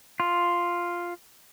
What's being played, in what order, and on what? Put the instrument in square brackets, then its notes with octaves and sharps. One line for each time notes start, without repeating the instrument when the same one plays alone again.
[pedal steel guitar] F4